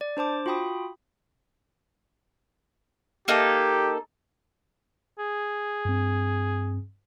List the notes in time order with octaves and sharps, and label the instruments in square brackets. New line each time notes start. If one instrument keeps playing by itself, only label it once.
[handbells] D5
D4 C5 A5 D6
F4 F#4 G5 B5 D#6
[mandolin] A#3 D#4 A4 [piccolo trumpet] G4
[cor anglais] G#4
[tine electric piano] G2 C4